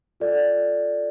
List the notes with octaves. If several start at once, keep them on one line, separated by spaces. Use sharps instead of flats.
F4 A4 D5